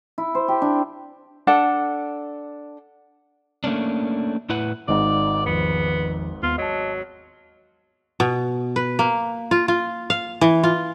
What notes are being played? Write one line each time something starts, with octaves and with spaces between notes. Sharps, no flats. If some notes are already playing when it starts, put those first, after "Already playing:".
E4
C5
G4
D4
D4 A4 F#5
A3 A#3 C#4 D4
A2 E4 B4 F#5
G#1 G#2 D#4 D5 D#5 F#5
E2 D#3 F3 B3
D#2 B3 F4
F#3 D#5 A5
B2
B4
A#3
F4
F4
F5
E3
F4